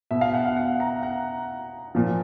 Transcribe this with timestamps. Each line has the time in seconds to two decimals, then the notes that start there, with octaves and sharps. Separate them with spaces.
0.11 B2 E5
0.21 F5
0.34 F#5
0.45 F5
0.56 F#5
0.80 A#5
1.03 F#5
1.95 A#2 F3